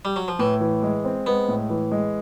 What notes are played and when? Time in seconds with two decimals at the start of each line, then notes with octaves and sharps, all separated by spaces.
0.05 G3
0.16 F#3
0.28 F3
0.39 A2 E3
0.60 E3
0.83 G#3
1.05 C4
1.27 G#3 B3
1.48 A2
1.70 E3
1.92 G#3